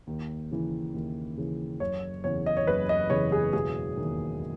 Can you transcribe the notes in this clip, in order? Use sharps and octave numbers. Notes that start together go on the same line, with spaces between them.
D#2
C#3 E3
D#2
C#3 E3
F#1 C#5
E2 C#3 E3 C#5
D#5
C#5
F#1 B4
D#5
E2 C#3 E3 C#5
G#4
E1 G#4
D#2 D#3